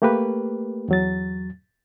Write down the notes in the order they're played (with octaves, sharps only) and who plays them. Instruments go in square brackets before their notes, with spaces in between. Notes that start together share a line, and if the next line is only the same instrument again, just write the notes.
[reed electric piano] A3 A#3 G4 A#4 B4
E2 F#3 A6